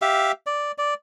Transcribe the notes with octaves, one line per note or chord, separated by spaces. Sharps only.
G4 E5 F5
D5
D5